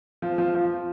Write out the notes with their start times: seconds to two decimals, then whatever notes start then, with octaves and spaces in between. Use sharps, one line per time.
0.22 F3
0.38 F3
0.55 F3